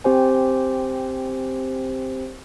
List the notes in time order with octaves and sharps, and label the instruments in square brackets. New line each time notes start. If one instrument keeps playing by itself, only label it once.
[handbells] C4 G4 C5 G#5